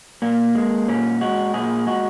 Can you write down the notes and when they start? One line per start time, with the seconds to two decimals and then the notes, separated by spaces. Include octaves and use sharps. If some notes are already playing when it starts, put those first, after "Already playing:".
0.22 A#2 A#3
0.55 G#3
0.88 A#2 C#4
1.21 G#3 F#4
1.53 A#2 G#4
1.87 G#3 F#4